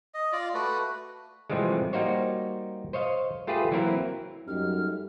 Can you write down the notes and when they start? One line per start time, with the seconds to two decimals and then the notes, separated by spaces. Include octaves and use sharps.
0.14 D#5
0.33 F4 D5
0.54 A3 F#4 B4
1.50 A2 C3 E3 F3 G3 G#3
1.93 G3 A#3 D#4 F#4 C5 C#5
2.93 C5 C#5 D#5 F5
3.47 A3 F4 G4 G#4 B4
3.71 E3 F#3 A#3 C4 E4 A#4
4.47 F#2 G3 A3 D#4 F6